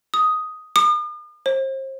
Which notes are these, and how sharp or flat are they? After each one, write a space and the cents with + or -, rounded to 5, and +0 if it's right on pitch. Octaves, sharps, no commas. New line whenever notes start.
D#6 +5
D#6 -45
C5 +35